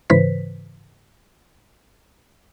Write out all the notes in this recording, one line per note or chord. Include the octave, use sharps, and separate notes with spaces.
G#2 C#3 E3 B4 C5 B6